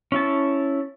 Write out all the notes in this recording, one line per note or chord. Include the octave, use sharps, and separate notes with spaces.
C#4 E4 A5